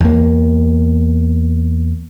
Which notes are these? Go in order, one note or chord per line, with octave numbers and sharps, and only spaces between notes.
E2 A#3